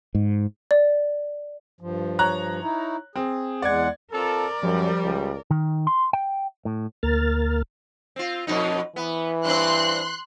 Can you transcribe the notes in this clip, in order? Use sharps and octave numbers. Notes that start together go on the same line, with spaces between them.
G#2
D5
G2 F3
C#5 A#5 F#6
D#4 E4
C4 G#4
E2 G#3 D5 F#5 G#6
C4 F4 A4 A#4 D5 A#5
F#2 F3 G3
C#2
D#3
C6
G5
A2
D2 A#3 A#4 F6 A6
C4 F4
F2 B2 D#4
E3 B3
G2 C4 C6 F#6